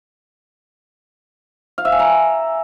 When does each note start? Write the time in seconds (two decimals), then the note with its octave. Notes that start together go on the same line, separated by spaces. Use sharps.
1.78 F5
1.85 E5
1.92 G#5
1.99 A#5